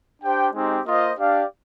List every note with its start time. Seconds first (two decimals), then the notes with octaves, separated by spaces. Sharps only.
0.22 D4 G4 C5 G5
0.53 G#3 C4 D#4 G4
0.86 A#3 F4 C5 D#5
1.17 D4 G4 D5 F5